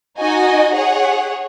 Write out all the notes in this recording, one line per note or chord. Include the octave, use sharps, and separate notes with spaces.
D#4 F#4 D#5 G#5
G#4 C#5 F#5